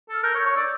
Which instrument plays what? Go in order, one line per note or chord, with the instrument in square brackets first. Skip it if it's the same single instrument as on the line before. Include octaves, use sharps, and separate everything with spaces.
[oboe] A4 [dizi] F6
[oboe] A#4 [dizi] G6
[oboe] C#5
C#5
[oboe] D5 [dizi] E6